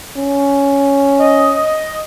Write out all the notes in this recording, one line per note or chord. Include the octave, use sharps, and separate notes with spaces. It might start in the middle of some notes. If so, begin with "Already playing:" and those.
C#4
D#5